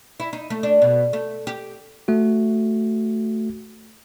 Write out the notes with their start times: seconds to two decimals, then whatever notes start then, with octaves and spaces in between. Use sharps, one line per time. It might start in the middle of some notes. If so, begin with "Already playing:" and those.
0.20 E4
0.33 D#4
0.50 A3
0.63 D4
0.82 B2
1.13 A3
1.47 G4
2.08 A3 F#4